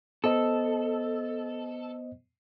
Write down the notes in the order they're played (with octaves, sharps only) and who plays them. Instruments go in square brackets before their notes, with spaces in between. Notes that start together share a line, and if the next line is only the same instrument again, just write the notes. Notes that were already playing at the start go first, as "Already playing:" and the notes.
[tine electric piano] B3 C5 D#5 [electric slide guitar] A4